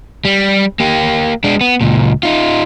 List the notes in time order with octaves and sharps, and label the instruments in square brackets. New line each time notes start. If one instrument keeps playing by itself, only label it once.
[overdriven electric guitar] G3
A#3 G4
G#3 D4
B3
C#2 A#2
D#4 F4